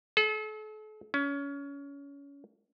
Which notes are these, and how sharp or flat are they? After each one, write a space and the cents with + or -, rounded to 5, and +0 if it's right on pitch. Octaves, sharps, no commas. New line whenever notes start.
A4 -40
C#4 +25